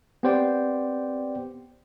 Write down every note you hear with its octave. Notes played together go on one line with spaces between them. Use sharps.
B3 C4 G4 C5 D5 G5